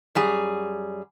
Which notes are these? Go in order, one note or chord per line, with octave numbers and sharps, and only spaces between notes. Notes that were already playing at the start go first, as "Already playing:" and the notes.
F#2 G3 G#4